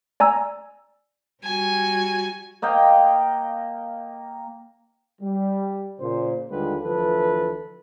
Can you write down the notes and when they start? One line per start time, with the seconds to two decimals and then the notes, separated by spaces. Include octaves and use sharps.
0.20 D5 G#5 A#5 E6
1.44 G3 F#4 G#5
2.62 A#3 D#5 F5 G5
5.22 G3
6.00 A#2 C#3 C5
6.51 D#2 D3 G3 G#3 F4 B4
6.84 D2 E3 F3 A4 B4